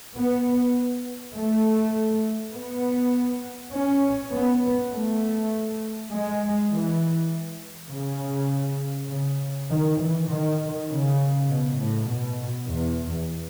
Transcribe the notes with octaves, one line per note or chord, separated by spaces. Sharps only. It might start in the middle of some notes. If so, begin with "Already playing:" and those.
B3
A3
B3
C#4
B3
A3
G#3
E3
C#3
C#3
D#3
E3
D#3
C#3
B2
A2
B2
E2